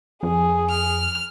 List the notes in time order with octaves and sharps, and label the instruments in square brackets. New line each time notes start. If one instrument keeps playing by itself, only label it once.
[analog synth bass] F2 [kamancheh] G#4
[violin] F6